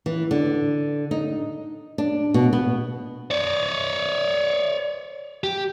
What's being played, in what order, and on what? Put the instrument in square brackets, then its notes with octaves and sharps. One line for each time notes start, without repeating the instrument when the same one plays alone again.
[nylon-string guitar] E3
D3
D#4
D4
B2
B3
[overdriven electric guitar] C#5 D5
G4